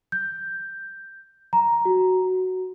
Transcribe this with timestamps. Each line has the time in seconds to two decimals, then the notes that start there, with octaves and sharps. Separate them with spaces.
0.12 G6
1.53 A#5
1.85 F#4